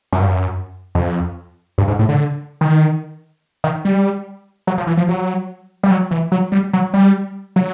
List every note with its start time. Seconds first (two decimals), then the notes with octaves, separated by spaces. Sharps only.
0.13 F#2
0.21 G2
0.27 F#2
0.95 F2
1.78 G2
1.88 G#2
1.99 A2
2.09 D3
2.61 D#3
3.64 D#3
3.85 G3
4.67 F#3
4.78 F3
4.87 E3
4.97 F3
5.09 F#3
5.83 G3
5.91 F#3
6.11 E3
6.32 F#3
6.52 G3
6.73 F#3
6.94 G3
7.56 F#3